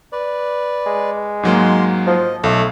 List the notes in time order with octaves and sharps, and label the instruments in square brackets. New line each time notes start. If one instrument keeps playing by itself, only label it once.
[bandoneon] B4 D5
[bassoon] G#3
[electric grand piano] G#2 F#3 A#3 [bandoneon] C6
[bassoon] F3 [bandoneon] D#5
[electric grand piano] B1 [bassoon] A3 [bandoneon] A4